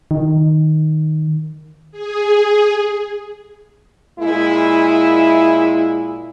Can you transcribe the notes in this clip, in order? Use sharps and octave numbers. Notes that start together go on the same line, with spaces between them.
D#3
G#4
A#2 G#3 E4